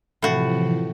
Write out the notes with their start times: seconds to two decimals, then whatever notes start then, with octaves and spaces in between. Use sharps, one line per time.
0.22 A2 C3 E3 F3 F#4